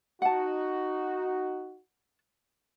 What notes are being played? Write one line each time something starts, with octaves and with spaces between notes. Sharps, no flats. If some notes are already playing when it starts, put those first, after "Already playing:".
D#4 F#4 F#5 A5